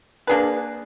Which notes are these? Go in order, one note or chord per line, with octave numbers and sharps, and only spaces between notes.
A#3 D4 G#4 B4